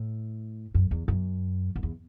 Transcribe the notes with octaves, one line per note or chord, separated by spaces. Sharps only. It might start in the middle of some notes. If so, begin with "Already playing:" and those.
Already playing: A2
F#2
E2
F#2
F#2
E2